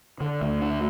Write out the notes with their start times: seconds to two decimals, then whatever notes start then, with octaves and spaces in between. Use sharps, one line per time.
0.20 D3
0.41 D2
0.62 D4